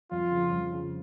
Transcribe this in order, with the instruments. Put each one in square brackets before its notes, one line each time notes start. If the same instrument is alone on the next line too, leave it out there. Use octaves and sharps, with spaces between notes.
[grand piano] F2 [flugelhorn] F4
[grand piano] C#3 F3
F2
C#3 F3